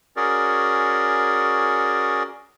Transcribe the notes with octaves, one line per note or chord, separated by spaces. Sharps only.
C#4 F#4 G#4 A#4 D5